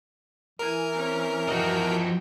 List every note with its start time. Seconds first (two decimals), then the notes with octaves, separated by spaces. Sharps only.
0.59 E3 E4 A#4 G#5
0.93 C4 C#4
1.48 F3 F#4 D#5 G5